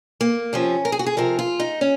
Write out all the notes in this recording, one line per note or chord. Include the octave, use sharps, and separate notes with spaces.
A#3
C3 F3 C#4
A#4
G#4
F#4
G#4
C3 F3 A#4
F4
D#4
C#4